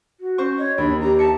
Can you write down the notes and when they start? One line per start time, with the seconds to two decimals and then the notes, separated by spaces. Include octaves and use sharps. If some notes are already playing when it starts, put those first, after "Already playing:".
0.20 F#4
0.38 C#4 C5 C#6
0.58 C#5 D#5
0.78 D#2 D4 B5
1.00 G4 A#5
1.19 E5 A5 C#7